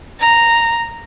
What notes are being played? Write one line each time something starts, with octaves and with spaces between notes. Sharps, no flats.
A#5